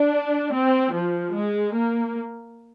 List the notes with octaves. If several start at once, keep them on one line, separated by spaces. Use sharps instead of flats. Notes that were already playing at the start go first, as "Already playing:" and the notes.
Already playing: D4
C4
F3
G#3
A#3